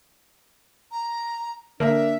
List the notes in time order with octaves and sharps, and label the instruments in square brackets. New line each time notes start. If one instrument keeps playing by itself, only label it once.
[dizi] A#5
[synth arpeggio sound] D3 A#3 [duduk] D4 [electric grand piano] A#4 [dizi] E5